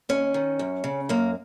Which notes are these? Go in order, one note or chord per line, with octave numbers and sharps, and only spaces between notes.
D#2 C#4
D#3
F#2
C#3
F#2 A#3